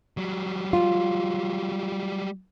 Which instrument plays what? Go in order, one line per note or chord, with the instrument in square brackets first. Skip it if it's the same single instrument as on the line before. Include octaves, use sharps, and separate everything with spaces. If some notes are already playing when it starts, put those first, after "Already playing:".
[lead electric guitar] F#3 G3
[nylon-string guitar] F4